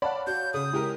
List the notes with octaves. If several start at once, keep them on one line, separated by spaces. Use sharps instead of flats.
C#5 D5 F5 F#5 A5 B5
F#4 G6
C#3 D#6
G#3 E4 G4 A#4